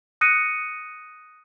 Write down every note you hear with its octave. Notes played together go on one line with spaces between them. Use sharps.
D#6 F#6 A#6 C#7 D#7